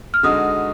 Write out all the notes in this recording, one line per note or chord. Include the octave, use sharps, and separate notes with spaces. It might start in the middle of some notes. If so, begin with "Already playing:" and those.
F6
D3 G#3 D#4 F#4 D#6